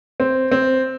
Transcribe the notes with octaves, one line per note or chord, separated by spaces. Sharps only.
C4
C4